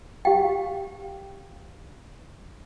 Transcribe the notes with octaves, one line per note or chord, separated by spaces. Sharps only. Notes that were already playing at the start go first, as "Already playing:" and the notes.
G4 F5 G5